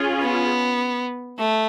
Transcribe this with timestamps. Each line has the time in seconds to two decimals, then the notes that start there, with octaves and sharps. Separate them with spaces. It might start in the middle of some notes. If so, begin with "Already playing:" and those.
Already playing: C#4 F4 G#4
0.22 B3
1.39 A3